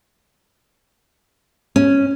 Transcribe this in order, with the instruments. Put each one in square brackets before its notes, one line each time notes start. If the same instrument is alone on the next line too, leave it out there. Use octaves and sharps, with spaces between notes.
[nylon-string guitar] C#4